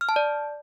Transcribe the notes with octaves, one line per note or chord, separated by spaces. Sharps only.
F6
A5
D5